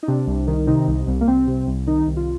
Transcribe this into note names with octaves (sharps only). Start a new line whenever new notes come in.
D#4
C3 D4
C2
D#3
C3 D#4
C2
C2
A#3
C2 C4
C3
C2
D#3 D#4
C2
F4